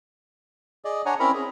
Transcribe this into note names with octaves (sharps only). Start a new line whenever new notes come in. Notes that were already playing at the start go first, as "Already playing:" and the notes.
G#4 D5 D#5
D4 C#5 F#5 G#5 A#5
C4 C#4 E4 A#4 A#5 B5
G#4